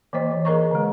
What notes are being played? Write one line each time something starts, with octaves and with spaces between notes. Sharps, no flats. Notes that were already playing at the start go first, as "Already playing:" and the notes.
E3 A#3 C5 C#5 D#5
E3
G#4 A#4 D#5 A#5 C#6
D3 G#3